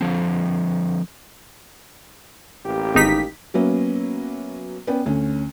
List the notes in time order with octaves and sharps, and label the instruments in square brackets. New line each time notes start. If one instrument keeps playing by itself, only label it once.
[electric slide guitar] D3 F3 C4
[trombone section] A1 A#3 G4
[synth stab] G#1 D#4 B6
[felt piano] F#3 A#3 B3 C#4 E5
B3 C#4 D5 G5
D2 C#4